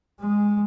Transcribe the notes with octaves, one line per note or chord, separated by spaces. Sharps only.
G#3